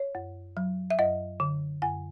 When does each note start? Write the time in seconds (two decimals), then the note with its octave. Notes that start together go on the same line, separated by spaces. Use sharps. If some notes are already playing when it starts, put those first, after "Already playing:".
Already playing: C#5
0.15 F#2
0.57 F#3
0.90 E5
0.99 F#2 D#5
1.40 D3
1.82 F#2 G#5